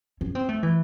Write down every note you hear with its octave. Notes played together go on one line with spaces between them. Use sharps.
C#4
C4
A3
E3